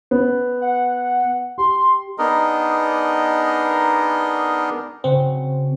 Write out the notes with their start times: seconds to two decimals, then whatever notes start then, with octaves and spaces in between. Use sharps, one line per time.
0.11 B3
0.61 F#5
1.58 G4 C6
2.18 B3 D4 D#4 G#4 A#4 D#5
5.04 C#3 C4 F#4